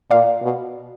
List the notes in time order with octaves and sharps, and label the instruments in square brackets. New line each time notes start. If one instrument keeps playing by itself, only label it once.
[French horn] A#2 [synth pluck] D5 F5
[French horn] B2